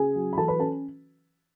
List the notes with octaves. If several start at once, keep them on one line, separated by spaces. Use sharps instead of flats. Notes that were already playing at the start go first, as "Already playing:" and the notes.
Already playing: C#3 G#4 G#5
F#3
B5
E3 A4 A5
B4 B5
C#4 A4 A5